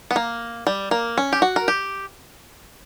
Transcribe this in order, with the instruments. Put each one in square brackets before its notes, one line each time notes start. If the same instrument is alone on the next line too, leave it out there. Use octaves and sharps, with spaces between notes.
[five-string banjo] B3
A#3
G3
A#3
C#4
G4
F#4
A#4
G4